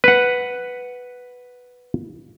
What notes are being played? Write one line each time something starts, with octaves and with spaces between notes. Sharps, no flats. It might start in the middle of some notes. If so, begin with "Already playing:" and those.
B4 F#5